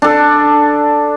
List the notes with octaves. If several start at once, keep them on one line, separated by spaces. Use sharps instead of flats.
D4 A4